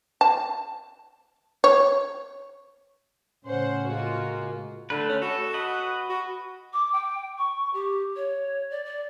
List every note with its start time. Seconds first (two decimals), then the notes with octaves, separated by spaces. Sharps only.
0.21 A5
1.64 C#5
3.45 A2 C#3 C#4 C5 F#5
3.87 G#3 A#3 F4 F#4
4.90 D3 A3 B4
5.09 C#4
5.22 F#4 A4
5.54 B4 D#5 F#5
6.09 F#4
6.73 D6
6.92 G5
7.37 C#6
7.73 G4
8.16 C#5
8.70 D5
8.85 D5